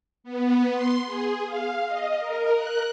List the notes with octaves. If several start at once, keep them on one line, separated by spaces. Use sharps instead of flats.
B3
C6
G#4
F5
D#5
A#4
F#6